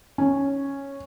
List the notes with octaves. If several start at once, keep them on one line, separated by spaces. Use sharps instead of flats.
C#4